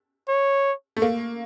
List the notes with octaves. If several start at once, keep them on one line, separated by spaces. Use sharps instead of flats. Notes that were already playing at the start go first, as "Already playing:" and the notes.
C#5
A3
A#3